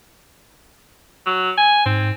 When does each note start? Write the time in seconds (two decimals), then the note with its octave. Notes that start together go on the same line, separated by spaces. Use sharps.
1.26 F#3
1.58 G#5
1.86 G#2 C4